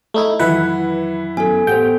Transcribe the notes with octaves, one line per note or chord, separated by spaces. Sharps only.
A3 D#4 E4
F2 D#3 E3 F#3 E4 B4 F#5
F#2 B3 A4 G#5
A2 B3 G4 A4 C5 F#5 G5